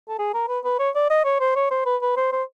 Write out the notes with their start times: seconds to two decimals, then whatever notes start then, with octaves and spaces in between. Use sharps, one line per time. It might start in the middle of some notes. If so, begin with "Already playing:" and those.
0.08 A4
0.19 G#4
0.34 A#4
0.48 B4
0.64 B4
0.79 C#5
0.95 D5
1.10 D#5
1.25 C#5
1.40 C5
1.56 C#5
1.71 C5
1.86 B4
2.02 B4
2.17 C5
2.32 C5